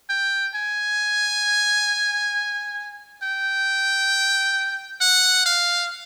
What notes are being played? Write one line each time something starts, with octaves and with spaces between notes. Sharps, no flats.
G5
G#5
G5
F#5
F5